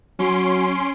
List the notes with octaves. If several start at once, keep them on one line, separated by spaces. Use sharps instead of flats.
F#3 C#4 C6 D7